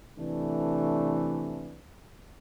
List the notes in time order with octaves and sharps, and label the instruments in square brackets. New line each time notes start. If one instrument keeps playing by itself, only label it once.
[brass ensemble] C3 E3 A3 D4